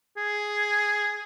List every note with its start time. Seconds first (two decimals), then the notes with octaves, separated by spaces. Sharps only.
0.17 G#4